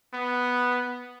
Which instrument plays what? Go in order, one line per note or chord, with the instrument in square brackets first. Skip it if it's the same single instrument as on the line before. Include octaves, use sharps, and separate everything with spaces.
[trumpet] B3